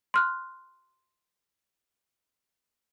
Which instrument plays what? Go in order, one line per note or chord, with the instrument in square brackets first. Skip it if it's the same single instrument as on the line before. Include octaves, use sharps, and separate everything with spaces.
[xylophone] C6 F6 F#6